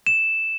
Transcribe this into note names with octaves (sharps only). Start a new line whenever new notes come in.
E7